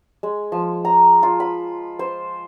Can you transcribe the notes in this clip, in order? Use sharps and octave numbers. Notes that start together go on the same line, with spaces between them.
G#3
F3
A#5
F4
B5
C5